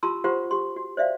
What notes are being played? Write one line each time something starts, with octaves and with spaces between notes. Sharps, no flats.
F4 G4 A5 A#5 C6 E6
F4 G4 C5 F#5 A#5 C6
G4 C6
F#4
C5 D5 E5 F5